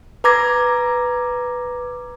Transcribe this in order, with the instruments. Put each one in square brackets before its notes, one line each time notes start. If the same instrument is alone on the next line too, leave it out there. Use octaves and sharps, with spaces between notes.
[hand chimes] B4 A#5 D6 G#6 A#6